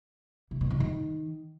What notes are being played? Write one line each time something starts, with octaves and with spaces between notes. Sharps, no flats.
C3
B2
C3
D#3